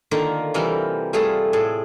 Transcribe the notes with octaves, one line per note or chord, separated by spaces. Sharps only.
D3 D#3 A#3 F4 A#4
C3 E3 G3 F4 A#4
G3 A3 F4 G#4 A4
A2 G#4 A4